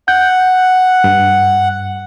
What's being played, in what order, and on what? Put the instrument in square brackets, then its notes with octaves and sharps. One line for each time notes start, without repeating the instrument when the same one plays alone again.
[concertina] F#5 [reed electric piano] G6
[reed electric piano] G2